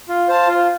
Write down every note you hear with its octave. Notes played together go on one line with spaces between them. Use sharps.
F4
C5 F5 A5
F4